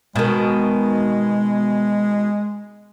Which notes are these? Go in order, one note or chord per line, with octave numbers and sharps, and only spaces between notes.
B2 D#3 G#3